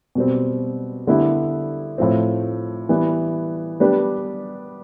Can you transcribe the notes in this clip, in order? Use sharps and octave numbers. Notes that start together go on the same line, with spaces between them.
B2 G3 C4
D3 G3 B3 E4 G4
A2 F3 C4
E3 G3 B3
G3 B3 D4 G4 B4